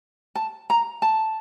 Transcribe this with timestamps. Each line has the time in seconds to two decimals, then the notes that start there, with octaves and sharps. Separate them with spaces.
0.35 A5
0.70 A#5
1.02 A5